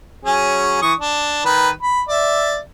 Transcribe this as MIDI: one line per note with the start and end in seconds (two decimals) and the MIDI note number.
0.25 0.78 54
0.25 0.78 61
0.25 0.78 68
0.82 0.93 52
0.82 0.93 85
0.82 0.93 87
0.99 1.41 62
1.45 1.69 51
1.45 1.69 71
1.83 2.02 83
2.08 2.58 74
2.08 2.58 76